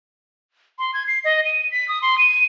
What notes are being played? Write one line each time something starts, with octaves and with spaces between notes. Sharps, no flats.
C6
G#6
C7
D#5
D#7
B6
D#6
C6
D#7